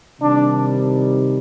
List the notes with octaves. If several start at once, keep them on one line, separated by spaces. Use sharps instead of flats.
C3 D#3 G3 D4